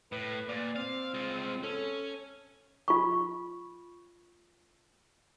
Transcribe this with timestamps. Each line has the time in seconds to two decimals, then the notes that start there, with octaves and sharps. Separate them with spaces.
0.12 A2 B4
0.48 A#2 D5
0.76 C4 F5
1.14 G#3 F4
1.63 C#4 A4
2.88 F4 C#6